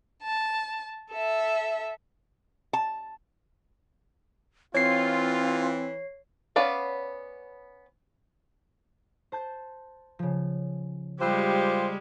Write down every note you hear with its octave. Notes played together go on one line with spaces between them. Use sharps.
A5
A4 E5
A5
E3 C4 F4 C#5 C7
B3 C#4 B4 D5 F5
C5 A5 G6
C#3 F3
G3 G#3 F4 G4 C5 B5 E6 F#6